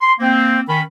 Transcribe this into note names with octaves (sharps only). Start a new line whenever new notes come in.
C6
A#3 C4
D#3 C#4 B5